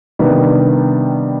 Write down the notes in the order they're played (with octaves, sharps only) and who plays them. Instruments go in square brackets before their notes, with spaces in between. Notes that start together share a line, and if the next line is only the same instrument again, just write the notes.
[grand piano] C3 D#3 G3 B3 D4